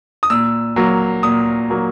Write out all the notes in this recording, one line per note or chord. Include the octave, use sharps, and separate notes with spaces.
D#6
A#2 E6
F#3 A#3
A#2 D#6
F#3 A#3